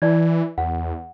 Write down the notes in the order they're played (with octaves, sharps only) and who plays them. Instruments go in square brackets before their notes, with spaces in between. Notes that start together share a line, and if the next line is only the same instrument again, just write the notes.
[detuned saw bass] E3 [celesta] E4 D5 G#6
[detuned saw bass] E2 [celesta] F#5